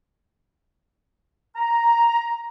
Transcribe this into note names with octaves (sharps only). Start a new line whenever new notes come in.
A#5